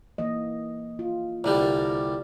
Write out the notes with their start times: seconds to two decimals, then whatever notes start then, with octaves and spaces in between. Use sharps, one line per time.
0.18 E3 A#3 D#5
0.99 F4
1.44 C2 D3 G3 D5
1.62 A#4